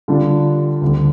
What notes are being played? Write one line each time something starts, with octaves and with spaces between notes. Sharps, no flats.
D3 G3 D4 F4
D2 D3 G3